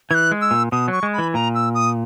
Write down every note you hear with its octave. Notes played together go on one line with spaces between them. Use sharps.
E3 F#6 G#6
G#3
E6
A#2
B2 D#6
F#3 C#6
G#3
B5
E3
A#2 A#5
E6
D#6